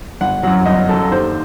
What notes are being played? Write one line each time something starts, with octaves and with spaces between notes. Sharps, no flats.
G1 F#5
F#2 F#3 F#5
G1 D#5
F#2 F#3 A4
D#2 C5